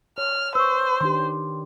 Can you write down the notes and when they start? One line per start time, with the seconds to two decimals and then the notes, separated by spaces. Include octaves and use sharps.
0.18 C#5 F6
0.55 B4 C5 C#6 E6
1.01 D#3 D4 G4 C6